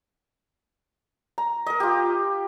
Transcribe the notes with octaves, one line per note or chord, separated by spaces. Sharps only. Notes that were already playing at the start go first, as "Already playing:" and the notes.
A#5
A#4 D#5
F4 G4